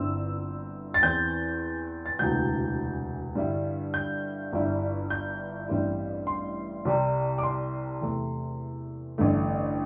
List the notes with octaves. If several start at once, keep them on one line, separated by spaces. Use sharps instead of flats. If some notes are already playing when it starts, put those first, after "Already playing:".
Already playing: G1 G2 D3 C4 E4 E6
A6
E2 E3 C4 G6
A6
E1 D2 C3 E3 G6
G2 D3 G3 E4
G6
G1 G2 G3 E4
G6
A1 G2 G3 C4 E4
C6
C2 C3 G3
D6
C6
E2 C3 A3
A1 G2 D3 A3